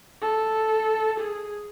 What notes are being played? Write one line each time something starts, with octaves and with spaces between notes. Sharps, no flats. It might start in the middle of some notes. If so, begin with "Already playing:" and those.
A4
G#4